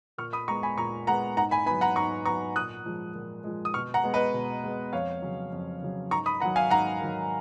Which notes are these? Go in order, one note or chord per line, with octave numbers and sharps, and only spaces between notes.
A#2 C#6 F6
B5 D#6
G#3 B3 A#5 C#6
G#5 B5
A#2 A#5 C#6
G#3 B3 F#5 A#5
G#2 F#5 A#5
G#5 B5
F#3 B3 G#5 B5
F#5 A#5
G#2 A#5 C#6
F#3 B3 A#5 C#6
A#2 D#6 F#6
F3 G#3
A#2
F3 G#3
D#6
B2 C#6 F6
F#5 A#5
G#3 B3
B4 D#5
B2
G#3 B3
F2 C#5 F5
C#3 F#3 C#4
F2
C#3 F#3 C#4
G#2 A#5 C#6
B5 D#6
D#3 F#3 F#5 A#5
F5 G#5
G#2 F#5 A#5
D#3 F#3